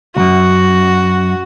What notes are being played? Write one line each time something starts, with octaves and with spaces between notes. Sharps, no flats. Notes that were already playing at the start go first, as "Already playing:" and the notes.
C#2 F#2 F#4